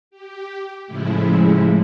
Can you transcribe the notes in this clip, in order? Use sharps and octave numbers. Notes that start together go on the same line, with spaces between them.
G4
A2 C#3 F3 G#3 A3 E4